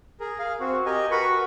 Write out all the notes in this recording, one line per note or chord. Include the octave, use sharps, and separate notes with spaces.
G#4 A#4
G#4 F5
C4 F#4
G4 A#4 D#5 G#5
F#4 A#4 B4 B5 C#6
F#5